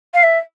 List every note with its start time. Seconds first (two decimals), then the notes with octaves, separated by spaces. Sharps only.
0.14 F5
0.23 E5